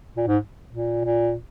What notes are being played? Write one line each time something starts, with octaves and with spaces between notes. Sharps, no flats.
A#2
G#2
A#2
A#2